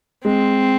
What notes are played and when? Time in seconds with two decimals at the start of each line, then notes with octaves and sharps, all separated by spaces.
0.25 G#3 C4